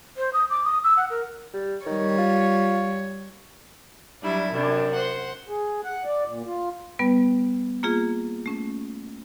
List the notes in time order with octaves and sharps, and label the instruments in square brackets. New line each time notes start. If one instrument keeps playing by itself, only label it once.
[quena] C5
D#6
D6
D#6
E6
F#5
A#4
[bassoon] G3
[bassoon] D#3 [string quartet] G3 C#5
[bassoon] F4
[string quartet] F#3 G3 D4 E4
F#2 C3 D4
C5 F#5
[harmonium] G#4
F#5
D5
A#2
F4
[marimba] G3 B3 B4
A#3 F4 G#4
A3 C#4